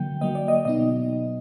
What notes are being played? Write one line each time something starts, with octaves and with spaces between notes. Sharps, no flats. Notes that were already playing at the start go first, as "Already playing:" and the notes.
Already playing: D3 F#3 A#3 G5
D3 F#3 A#3 D#5
D5
D#5
B2 F#3 B3 D#4 D#5